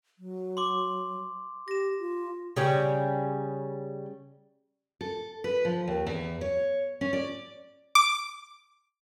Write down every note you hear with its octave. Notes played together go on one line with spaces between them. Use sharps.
F#3
C6 D6
G4 A#6 E7
F4
C#3 G3 C#4
A4
B4
F3
D#2
E2
C#5
C#4
D5
D6